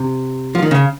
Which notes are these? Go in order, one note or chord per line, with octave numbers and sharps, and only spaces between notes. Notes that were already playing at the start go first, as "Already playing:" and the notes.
Already playing: C3
F3
D#3
C#3